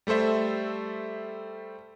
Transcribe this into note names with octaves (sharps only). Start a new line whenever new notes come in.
G3 A3 A4 C5 E5